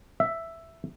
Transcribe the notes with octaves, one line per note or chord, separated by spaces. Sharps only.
E5